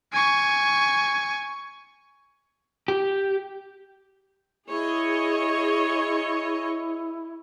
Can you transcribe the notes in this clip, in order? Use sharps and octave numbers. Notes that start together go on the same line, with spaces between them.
G#5 C#6
G4
E4 G#4 C#5 D#5